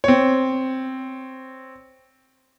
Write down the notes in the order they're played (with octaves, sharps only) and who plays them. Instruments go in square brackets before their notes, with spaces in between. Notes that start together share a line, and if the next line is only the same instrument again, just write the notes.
[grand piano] C4 C#5